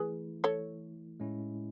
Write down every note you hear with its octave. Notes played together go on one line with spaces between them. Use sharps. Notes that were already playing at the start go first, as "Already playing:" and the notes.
Already playing: E3 A3 E4 G#4 B4
A4 C#5
A2 G#3 C#4 E4